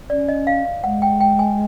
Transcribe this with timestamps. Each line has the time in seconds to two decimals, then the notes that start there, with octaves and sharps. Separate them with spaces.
0.10 C#4 D5
0.29 D#5
0.47 F5
0.65 F5
0.84 G#3 F#5
1.02 G5
1.21 G5
1.39 G#5